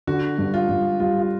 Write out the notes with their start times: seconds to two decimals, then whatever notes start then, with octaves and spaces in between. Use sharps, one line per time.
0.07 D3 F#4
0.38 G2
0.54 F4
0.69 G2
1.00 G3 F4
1.20 F4